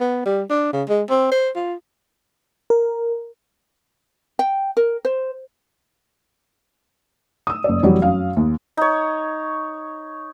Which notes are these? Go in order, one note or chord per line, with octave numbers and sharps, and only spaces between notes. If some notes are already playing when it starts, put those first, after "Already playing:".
B3
G3
D4
C#3
G#3
C4
C5
F4
A#4
G5
A#4
C5
D#6 E6
F#1 D5
F1 E3 F#3 G3 C#5 D5
F#2 F5
D#2
D#4 C#5